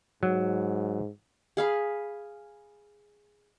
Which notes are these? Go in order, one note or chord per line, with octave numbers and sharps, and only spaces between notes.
G#2 F#3
G#4 F5 B5